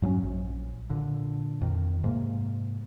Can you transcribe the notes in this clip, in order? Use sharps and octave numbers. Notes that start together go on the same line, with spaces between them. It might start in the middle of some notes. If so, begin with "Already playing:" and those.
G2 F#3 C4 C#4
A#1
A#2 D3
F2 D#3
G#2 C3 A#3